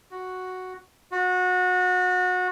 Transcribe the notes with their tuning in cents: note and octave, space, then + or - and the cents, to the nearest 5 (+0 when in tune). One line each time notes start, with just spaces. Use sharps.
F#4 +0
F#4 -25